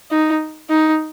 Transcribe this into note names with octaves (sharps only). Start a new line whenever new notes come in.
D#4
D#4